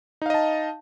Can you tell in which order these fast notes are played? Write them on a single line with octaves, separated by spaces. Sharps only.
D#4 F5 D#5 A5